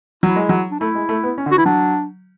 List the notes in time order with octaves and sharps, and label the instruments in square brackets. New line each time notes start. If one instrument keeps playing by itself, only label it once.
[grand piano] F#3 [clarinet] E4
[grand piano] G#3
F#3
[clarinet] D4
[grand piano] A3 [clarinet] E4
[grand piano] G#3
A3
B3
C#4
D3
[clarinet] F#4
[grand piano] E3 [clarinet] E4
[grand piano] F#3 [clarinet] D4